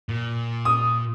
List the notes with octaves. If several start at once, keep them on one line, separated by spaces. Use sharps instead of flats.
A#2
D#6